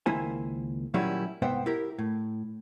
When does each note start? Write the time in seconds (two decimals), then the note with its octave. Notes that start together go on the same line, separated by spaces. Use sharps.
0.06 C#2 D#3 A#3 E4 C5 G#5
0.94 A#2 D#3 F#3 G3 C#4 E4
1.42 C2 G#2 B3 C5 E5 G5
1.66 E4 G4 A#4
1.98 A2